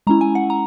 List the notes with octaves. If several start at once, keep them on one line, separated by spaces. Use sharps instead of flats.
G#3 C#4 E4 A#5
G#5
F#5
A#5